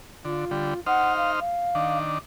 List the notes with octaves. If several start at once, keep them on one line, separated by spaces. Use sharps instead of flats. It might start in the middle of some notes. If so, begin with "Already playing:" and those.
D3 F4
D3 G3
D#4 C5 F#5 F6
F5
F5
D#3 D4